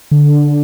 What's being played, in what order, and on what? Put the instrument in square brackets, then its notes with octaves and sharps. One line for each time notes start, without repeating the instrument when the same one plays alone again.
[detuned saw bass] D3